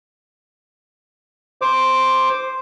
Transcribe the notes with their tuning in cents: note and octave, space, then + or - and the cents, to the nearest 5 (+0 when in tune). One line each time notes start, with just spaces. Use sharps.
C5 +0 D6 +0